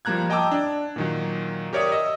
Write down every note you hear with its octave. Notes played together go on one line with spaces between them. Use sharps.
F3 G3 A#3 A#5 F#6 G#6
D#5 G5 A5 A#5 D6 E6
D4
A#2 D#3 F#3
G4 A#4 C#5 D5 E5 D#6
D#5 E6